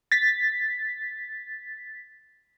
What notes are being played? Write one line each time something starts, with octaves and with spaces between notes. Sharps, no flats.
A6 B6